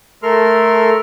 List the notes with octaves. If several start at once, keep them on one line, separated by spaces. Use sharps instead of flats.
A3 A4 A#4 C6 F6